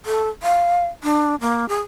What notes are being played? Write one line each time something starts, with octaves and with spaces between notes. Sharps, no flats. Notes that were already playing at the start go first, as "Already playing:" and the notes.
A4
F5
D4
A#3
G#4